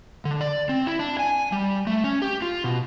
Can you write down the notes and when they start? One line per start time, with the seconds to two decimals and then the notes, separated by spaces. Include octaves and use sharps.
0.25 D3
0.41 D5
0.69 C4
0.86 E4
0.99 D4
1.19 G#5
1.52 G3
1.87 A3
2.04 C#4
2.22 G4
2.42 F4
2.64 B2